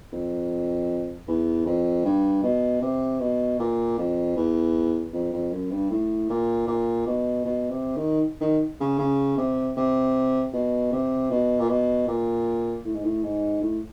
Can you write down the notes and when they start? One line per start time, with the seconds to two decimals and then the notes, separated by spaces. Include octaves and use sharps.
0.12 F2
1.28 E2
1.66 F2
2.05 G2
2.43 B2
2.82 C3
3.20 B2
3.59 A#2
3.98 F2
4.36 E2
5.13 F2
5.33 F2
5.52 F#2
5.71 G2
5.90 A2
6.29 A#2
6.67 A#2
7.06 B2
7.45 B2
7.70 C3
7.96 D#3
8.41 D#3
8.80 C#3
8.99 C#3
9.37 C3
9.77 C3
10.53 B2
10.92 C3
11.30 B2
11.59 A#2
11.69 B2
12.07 A#2
12.85 A2
12.94 G#2
13.04 A2
13.23 G#2
13.62 A2